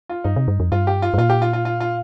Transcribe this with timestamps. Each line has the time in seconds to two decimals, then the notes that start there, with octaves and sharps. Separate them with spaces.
0.09 F4
0.24 G2 D#4
0.36 C3
0.48 G2
0.60 F2
0.72 G2 F4
0.87 G4
1.02 F4
1.14 G2
1.18 A#2 F4
1.30 G4
1.42 F4
1.53 F4
1.65 F4
1.80 F4